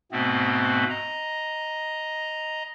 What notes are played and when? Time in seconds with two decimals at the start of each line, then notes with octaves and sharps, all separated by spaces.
0.12 G#2 B2 A3 B3 C4
0.89 D#5 A#5